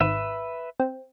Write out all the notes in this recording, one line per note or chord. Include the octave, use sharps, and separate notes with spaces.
G#1 B4 E5
C4